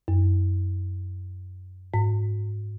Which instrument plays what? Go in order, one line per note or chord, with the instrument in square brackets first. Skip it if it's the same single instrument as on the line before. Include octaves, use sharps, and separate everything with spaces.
[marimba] F#2
G#2